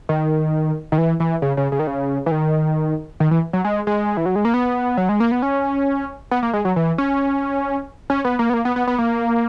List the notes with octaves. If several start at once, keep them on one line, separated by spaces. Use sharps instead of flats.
D#3
D#3
E3
E3
C#3
C#3
C#3
D#3
C#3
E3
D#3
D#3
E3
F#3
G#3
G#3
E3
F#3
G#3
A#3
B3
F#3
G#3
A#3
B3
C#4
B3
A#3
G#3
F#3
E3
C#4
C#4
B3
A#3
B3
A#3
B3
B3
B3
A#3